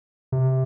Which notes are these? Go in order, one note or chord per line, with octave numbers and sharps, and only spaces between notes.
C3